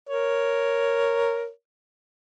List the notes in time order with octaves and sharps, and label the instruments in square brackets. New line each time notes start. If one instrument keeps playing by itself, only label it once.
[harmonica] A#4 C#5